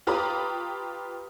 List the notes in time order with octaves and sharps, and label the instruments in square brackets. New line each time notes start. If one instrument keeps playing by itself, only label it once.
[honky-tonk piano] F4 G4 B4 A#5 D#6